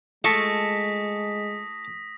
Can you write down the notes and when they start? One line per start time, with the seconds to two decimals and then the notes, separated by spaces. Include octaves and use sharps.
0.24 G#3 A3 F4 A5 C#6 D#6 A#6 B6